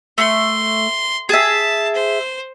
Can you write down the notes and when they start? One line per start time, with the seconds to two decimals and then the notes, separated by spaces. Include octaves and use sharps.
0.18 A3 C6
1.29 G#4 E5 A5
1.95 C5